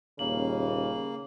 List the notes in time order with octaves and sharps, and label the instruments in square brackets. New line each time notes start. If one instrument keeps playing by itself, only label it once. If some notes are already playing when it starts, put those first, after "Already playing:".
[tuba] D#1 [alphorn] C#3 [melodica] A#3 [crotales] F#7